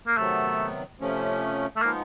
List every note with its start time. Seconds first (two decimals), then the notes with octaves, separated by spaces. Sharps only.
0.07 A#3
0.16 C3 D#3 F#3 A3 B3
1.00 C3 F3 A3 C#4
1.76 A3
1.82 F3 G#3 A#3 B3 D#4